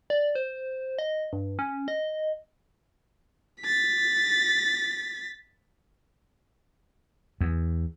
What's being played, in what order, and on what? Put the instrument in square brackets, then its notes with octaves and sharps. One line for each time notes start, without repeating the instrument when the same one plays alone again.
[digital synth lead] D5
C5
D#5
G2
C#4
D#5
[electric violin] A6 B6
[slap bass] E2